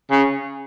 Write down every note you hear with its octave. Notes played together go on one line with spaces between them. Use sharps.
C#3